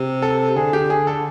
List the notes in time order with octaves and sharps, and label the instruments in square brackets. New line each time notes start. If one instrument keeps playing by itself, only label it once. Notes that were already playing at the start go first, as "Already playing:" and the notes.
Already playing: [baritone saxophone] C3
[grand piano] A4
[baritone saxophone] D3 [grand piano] G#4
[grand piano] G4
G#4
A4